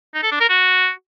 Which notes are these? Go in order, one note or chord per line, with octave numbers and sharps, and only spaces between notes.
D#4
A4
D4
A#4
F#4